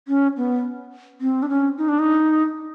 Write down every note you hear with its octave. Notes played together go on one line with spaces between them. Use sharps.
C#4
B3
C4
D4
C#4
D#4
D4
D#4